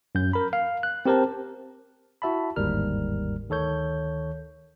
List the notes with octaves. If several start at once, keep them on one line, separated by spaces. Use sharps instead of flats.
F#2 G6
A#4 B5
F5
F#6
C4 G4 A#4 C5 A5
E4 F#4 E5 A5 B5
G1 D#2 G#2 G3 A#4 F6
D2 D#3 A4 C#5 G6